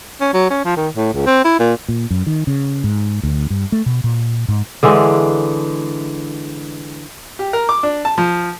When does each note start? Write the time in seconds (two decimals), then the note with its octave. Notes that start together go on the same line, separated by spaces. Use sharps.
0.21 C#4
0.34 F#3
0.50 C#4
0.65 F3
0.77 D#3
0.96 A2
1.13 C#2
1.26 C4
1.45 E4
1.59 A#2
1.88 A#2
2.10 F#2
2.27 D#3
2.47 C#3
2.84 G#2
3.23 D2
3.50 G2
3.72 A3
3.86 B2
4.04 A#2
4.48 G#2
4.83 D3 E3 G#3
7.39 G4
7.53 A#4
7.69 D6
7.83 D4
8.05 A5
8.18 F3